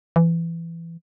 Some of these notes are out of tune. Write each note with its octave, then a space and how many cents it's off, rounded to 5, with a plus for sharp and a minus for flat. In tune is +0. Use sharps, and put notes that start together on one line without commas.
E3 +20